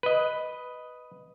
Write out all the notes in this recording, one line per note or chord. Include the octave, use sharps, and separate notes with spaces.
B4 D#5